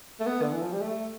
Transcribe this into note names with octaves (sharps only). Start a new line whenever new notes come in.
A3
B3
D3
E3
F3
G3
A3